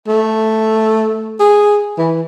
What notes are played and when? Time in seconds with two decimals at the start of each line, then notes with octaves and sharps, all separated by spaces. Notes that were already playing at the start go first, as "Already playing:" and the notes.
0.08 A3
1.40 G#4
1.98 E3